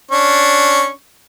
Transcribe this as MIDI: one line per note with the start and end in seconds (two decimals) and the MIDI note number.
0.11 0.89 61
0.11 0.89 62
0.11 0.89 85